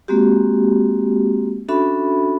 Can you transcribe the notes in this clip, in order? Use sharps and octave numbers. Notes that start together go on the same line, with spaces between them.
G#3 A#3 C4 F#4 G4
C#4 D4 F#4 A4 E5 B5